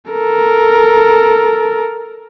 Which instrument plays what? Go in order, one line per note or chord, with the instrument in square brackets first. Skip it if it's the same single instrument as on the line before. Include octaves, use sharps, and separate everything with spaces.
[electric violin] A4 A#4